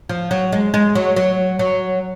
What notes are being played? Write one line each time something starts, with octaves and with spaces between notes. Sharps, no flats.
F3
F#3
G#3
G#3
F#3
F#3
F#3